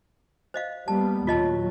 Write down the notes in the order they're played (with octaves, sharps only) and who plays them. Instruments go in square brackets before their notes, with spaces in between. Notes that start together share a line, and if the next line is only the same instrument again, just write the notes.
[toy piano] C5 D#5 F5
[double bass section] G3 A#3 B3 [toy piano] A5
[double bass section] D#2 A#2 F#3 [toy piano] F4 D#5 A5